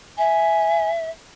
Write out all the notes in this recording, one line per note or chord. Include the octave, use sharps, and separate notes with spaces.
E5 G#5